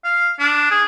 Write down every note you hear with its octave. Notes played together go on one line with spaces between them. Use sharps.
F5
D4
G#4